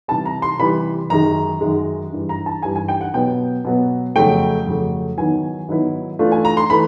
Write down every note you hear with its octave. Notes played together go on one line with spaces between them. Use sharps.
C3 E3 G3 A5
A#5
C6
C3 E3 G3 B5
F#2 D#3 G#3 A#5
F#2 D#3 G#3
G2 E3 G3
A#5
A5
G2 E3 G3 G#5
G#5
G5
F#5
B2 F#3 B3 G5
B2 F#3 B3
F2 C#3 F#3 A3 G5
F2 C#3 F#3 A3
G#2 D#3 F#3 B3 E4 G#5
G#2 D#3 F#3 B3 E4
E3 A3 D4 F4
G#5
A#5
C6
E3 A3 B5